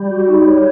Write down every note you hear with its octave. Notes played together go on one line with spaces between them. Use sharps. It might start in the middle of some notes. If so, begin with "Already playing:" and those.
Already playing: G3
F#4
D#4
C#5